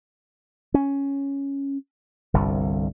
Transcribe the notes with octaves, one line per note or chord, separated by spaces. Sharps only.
C#4
G1 C2 G2